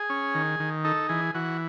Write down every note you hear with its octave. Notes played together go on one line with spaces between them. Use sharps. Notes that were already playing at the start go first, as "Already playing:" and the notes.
Already playing: G#4
C#4
D#3
D#3
D#4 A4
E3 G#4
E3 F#4